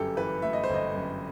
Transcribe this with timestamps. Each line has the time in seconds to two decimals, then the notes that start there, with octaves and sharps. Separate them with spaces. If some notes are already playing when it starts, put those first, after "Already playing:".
Already playing: G1 F#2 G4 A4
0.16 E3 B4
0.42 A3 E5
0.53 D#5
0.64 C5
0.69 G1
0.74 D#5
0.95 F#2